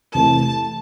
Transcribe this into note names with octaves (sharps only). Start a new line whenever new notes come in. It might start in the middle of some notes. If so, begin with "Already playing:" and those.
C3 E3 A3 A5